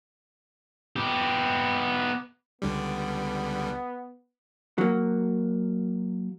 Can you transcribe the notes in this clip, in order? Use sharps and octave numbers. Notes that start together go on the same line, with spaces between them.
B3 G4
C#2 D3 G3 B3
F#3 A#3